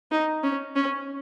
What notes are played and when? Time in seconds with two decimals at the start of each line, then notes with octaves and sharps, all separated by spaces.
0.11 D#4
0.43 C#4
0.76 C#4